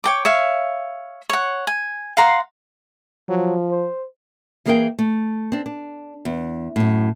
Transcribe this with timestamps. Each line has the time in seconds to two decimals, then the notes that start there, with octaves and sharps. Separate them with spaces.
0.04 C#5 G5 D6
0.25 C#5 E5 F5
1.29 C#5 F#5
1.67 G#5
2.17 F5 F#5 A#5 C6
3.29 F3 F#3
3.71 C5
4.66 E3 A#3 G#4 A#4 F5 G5
4.99 A3
5.52 C4 D4
5.66 D4
6.25 E2
6.76 F#2 A2